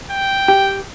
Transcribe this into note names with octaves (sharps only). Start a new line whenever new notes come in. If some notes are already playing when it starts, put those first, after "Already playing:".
G5
G4